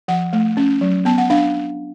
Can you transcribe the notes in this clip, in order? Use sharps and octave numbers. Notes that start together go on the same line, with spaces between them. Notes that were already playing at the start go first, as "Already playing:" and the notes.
F3 F#5
A3
C#4
F#3
B3 A5
F#5
D4 F5